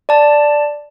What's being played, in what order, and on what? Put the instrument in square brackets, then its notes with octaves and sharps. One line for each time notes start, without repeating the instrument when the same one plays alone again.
[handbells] D5 A5